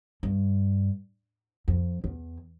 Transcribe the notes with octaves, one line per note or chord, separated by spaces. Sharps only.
G2
F2
E2